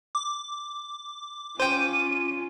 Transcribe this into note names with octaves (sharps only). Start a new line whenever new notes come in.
D6
C#4 F4 C5 G5 D#7